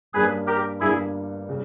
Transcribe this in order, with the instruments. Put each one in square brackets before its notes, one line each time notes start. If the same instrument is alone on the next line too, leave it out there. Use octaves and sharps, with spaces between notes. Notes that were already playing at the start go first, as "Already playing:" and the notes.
[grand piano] G2 G3 A#3 C#4 [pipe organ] G#4 B4
[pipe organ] G4 A#4
[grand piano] G1 G2 G3 A#3 [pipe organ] E4 G#4
[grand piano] C#3 G3